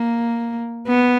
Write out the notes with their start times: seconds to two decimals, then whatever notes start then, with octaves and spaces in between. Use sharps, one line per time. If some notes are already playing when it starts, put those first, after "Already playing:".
Already playing: A#3
0.88 B3